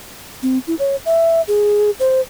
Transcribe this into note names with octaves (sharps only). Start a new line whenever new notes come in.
C4
E4
C#5
E5
G#4
C5